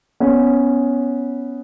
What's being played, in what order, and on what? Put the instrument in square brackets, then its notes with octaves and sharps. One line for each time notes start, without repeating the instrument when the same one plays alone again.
[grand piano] B3 C#4